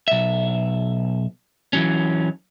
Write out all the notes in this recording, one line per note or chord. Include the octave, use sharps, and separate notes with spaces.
B1 E5
E3 F#3 C#4